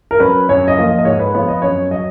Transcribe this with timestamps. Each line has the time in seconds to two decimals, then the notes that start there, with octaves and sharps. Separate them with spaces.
0.11 A#4
0.20 F#3 C#4 B4
0.49 F#2 C#5
0.68 D#5
0.76 F3 A#3
0.87 D#5
0.99 D#5
1.05 G#2 C#5
1.19 B4
1.34 F3 B3 C#5
1.48 D#5
1.62 F#2 C#5
1.91 F#3 D#5